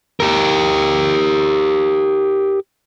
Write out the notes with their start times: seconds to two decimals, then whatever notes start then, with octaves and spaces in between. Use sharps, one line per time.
0.20 G4 A#4